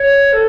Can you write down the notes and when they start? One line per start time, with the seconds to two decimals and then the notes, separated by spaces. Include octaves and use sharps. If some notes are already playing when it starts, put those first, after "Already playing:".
Already playing: C#5
0.33 A4